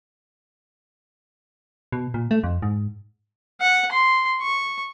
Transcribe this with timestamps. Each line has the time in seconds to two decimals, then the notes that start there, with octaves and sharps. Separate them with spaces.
1.92 B2
2.14 A#2
2.31 A3
2.44 F2
2.62 G#2
3.61 F#5
3.92 C6
4.42 C#6